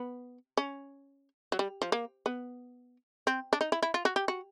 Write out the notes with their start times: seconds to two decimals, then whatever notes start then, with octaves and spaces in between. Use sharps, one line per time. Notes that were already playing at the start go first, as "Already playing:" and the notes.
Already playing: B3
0.57 C#4
1.52 F#3
1.59 G3
1.82 F3
1.92 A#3
2.26 B3
3.27 C4
3.53 D4
3.61 D#4
3.72 E4
3.82 E4
3.94 F4
4.05 F#4
4.16 G4
4.28 F#4